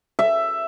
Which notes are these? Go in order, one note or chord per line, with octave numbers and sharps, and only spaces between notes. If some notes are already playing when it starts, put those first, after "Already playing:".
E5